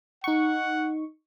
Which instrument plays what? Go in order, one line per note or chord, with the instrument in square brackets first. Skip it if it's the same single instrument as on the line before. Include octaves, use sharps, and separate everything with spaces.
[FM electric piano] D#4 C#6 [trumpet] F#5